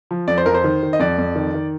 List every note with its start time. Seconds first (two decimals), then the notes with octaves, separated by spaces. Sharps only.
0.11 F3
0.28 F2 D5
0.38 C5
0.46 F2 A#4
0.54 C5
0.64 D#3
0.83 D#3
0.93 D#5
1.00 F2 D5
1.18 F2
1.36 D#3
1.54 D#3